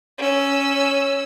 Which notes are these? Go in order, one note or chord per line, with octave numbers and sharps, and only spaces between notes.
C#4 E6